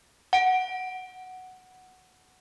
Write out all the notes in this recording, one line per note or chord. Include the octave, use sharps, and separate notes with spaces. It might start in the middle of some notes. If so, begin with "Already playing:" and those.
F#5 D7